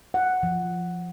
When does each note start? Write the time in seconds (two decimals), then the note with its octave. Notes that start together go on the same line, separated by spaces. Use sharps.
0.14 F#5
0.43 F3